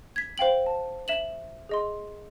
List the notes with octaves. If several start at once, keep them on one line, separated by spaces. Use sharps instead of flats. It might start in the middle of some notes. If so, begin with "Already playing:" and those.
G#6 B6
C5 F5 G5 F#7
A5
E5 E7 F#7
G#4 D#5 C6